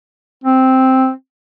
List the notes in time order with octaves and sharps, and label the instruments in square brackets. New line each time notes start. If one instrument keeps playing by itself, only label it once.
[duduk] C4